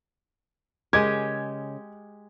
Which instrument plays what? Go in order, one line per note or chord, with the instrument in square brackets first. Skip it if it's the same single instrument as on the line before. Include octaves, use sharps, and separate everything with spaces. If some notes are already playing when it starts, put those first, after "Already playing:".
[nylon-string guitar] C#3 A#4 D#5 [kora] G#3 G4 [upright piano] G#6